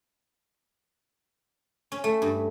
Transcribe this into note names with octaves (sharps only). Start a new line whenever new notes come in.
C#4
A3
G2